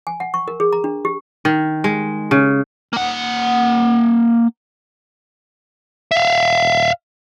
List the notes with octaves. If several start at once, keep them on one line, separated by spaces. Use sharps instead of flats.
G#5
F#5
C#6
A#4
G#4
A#5
D4
G4
D#3
G#3
C#3
A#3 F#5
E5 F5